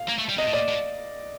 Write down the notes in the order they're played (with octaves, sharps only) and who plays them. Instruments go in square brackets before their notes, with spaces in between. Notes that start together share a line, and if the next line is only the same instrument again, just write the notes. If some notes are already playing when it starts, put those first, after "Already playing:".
Already playing: [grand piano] F5
[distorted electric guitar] A#3
A3
G3
[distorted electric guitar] C3 [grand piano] D#5
[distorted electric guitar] A2
[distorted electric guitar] A#2 [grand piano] D5
[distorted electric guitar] A2